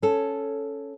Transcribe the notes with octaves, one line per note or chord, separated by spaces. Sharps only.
C#4 A4